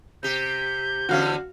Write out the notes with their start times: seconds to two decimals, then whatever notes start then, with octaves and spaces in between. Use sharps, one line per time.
0.23 C3 G4 G6
1.09 E2 D3 C#4 F#4 F5